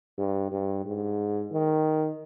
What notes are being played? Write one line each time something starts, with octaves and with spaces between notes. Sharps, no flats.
G2
G2
G#2
D#3